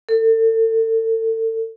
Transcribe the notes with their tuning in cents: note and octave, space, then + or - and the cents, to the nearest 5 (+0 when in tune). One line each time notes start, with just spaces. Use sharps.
A4 +35